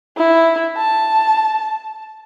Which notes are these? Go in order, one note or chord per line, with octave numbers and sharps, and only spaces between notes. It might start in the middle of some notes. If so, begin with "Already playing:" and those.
E4
A5